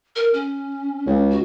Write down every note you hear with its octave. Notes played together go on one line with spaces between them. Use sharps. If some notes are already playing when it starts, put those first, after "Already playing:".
A#4
C#4
C#2
F#4